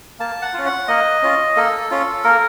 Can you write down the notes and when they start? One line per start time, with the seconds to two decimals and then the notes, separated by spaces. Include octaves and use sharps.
0.20 A#3 A5
0.42 F#5
0.54 C#4 F4
0.66 F#5
0.88 A#3 D#5
1.22 C#4 F4
1.56 A#3 A4
1.91 C#4 F4
2.24 A#3 A#4